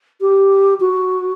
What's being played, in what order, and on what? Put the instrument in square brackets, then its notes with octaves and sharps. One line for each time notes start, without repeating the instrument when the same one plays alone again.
[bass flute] G4
F#4